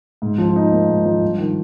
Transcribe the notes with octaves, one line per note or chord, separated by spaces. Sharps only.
G#2
F3
D#4
A#3
G#2
F3
G2
D#3